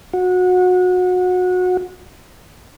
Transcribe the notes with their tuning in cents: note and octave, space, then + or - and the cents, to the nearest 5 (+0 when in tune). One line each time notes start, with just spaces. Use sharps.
F#4 -25